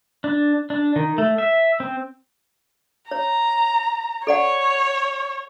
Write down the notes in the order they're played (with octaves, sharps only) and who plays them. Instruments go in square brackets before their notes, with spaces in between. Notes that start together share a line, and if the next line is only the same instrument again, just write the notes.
[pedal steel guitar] D4
D4
D#3
A3
E5
C4
[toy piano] C#5 [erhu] A#5
[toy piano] A4 D5 F#5 [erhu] C#5